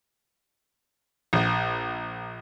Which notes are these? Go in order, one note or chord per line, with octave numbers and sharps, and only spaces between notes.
A#1